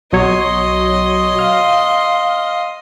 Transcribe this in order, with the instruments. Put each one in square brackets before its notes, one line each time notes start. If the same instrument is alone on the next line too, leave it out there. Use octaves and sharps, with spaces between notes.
[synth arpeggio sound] B1 F#3 C#5 [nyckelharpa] D#5 C6
[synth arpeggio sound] F5